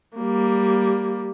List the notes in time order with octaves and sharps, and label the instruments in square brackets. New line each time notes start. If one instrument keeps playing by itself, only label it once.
[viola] G3 A#3